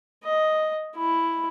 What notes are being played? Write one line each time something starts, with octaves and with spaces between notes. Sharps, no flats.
D#5
E4